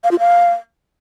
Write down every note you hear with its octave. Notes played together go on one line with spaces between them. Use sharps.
F5
F4
F5